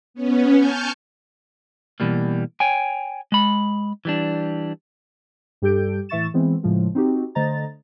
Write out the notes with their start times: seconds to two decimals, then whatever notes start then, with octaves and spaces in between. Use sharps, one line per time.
0.14 B3 C#4
0.56 G#5 A5 C#6 F6 G6
2.00 B2 E3 G3 A#3
2.60 C#5 G5 G#5
3.32 G#3 B5
4.05 E3 G3 D4
5.62 G2 G3 G4 A4 G6 D7
6.09 A2 E3 E5 C#6 A6 E7
6.34 E3 G#3 B3 C4
6.63 A2 C#3 F3 G#3
6.95 C4 D#4 F#4 G4
7.35 D3 A3 C5 D#5 A#5 A6